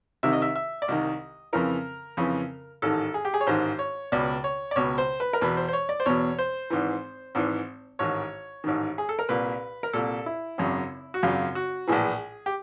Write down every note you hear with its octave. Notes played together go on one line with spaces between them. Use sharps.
C2 C3 D#3 E5
D#5
E5
E5
D5
C2 C3 D#3 D#5
F2 C#3 E3 A#4
F2 C#3 E3
A1 G#2 D#3 A4
G#4
G4
G#4
C#5
A1 G#2 D#3 C5
C#5
C#2 B2 D5
C#5
D5
C#2 B2 C#5
C5
B4
A#4
E2 B2 B4
C5
C5
C#5
D5
C5
E2 B2 C#5
C5
G#1 G#2 E3
G#1 G#2 E3
A1 G#2 D#3 C#5
A1 G#2 D#3
G#4
A4
A#4
C2 A#2 B4
A#4
C2 A#2 A4
E4
G#1 F#2 C#3
F#4
G#1 F#2 C#3 F4
F#4
A#1 A2 E3 G#4
G4